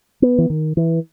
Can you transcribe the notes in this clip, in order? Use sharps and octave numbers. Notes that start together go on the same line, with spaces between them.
B3
E3
D#3
E3